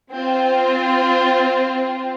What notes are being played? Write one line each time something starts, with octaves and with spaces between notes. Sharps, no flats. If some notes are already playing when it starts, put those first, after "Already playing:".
C4 F4